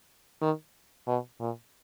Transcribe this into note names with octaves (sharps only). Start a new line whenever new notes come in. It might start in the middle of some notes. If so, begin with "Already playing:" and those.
D#3
B2
A#2